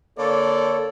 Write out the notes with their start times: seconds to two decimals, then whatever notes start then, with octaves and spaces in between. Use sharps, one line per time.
0.18 D3 A#3 A4 C#5 D5